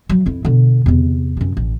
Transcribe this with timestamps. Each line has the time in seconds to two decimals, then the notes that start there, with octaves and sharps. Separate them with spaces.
0.09 F#3
0.26 F2 E4
0.45 B2 D3
0.86 E2 C3
1.37 F#2 C3
1.57 A1